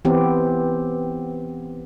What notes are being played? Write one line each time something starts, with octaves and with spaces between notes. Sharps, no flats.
E3 B3 C4 G4